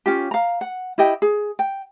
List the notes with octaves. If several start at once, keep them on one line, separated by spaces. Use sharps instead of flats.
C#4 F4 G4
F5 A#5
F#5
E4 G4 D#5 G5
G#4
G5